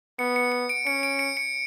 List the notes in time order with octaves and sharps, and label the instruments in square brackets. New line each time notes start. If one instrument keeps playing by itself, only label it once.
[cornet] B3 [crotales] C#7
[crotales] C#7
C#7
D7
[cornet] C#4 [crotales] C#7
[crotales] D7
C#7
C#7